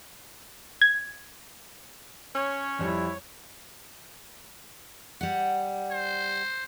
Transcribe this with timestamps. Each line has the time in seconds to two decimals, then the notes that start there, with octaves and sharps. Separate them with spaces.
0.82 G#6
2.35 C#4 C#5
2.79 F2 G3 E4
5.21 G3 F#5
5.91 C5